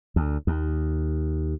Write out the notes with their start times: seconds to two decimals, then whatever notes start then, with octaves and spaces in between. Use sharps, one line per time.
0.16 D2
0.47 D#2